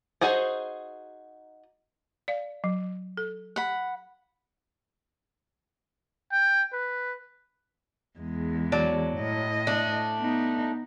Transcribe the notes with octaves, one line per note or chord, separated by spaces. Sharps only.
D#4 F#4 G#4 C5
D5 F5
F#3
A4
F#5 B5
G5
B4
E2 G#3
F#3 D5 A5
A2 D#5
A3 D4
B3 D#4